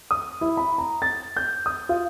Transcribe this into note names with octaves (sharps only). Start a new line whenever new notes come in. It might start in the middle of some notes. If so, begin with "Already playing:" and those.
D#6
E4
B5
A#5
A6
G6
D#6
F4